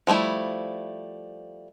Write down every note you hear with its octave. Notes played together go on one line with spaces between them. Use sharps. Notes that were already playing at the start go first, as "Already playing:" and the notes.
F3 G3 A3 E4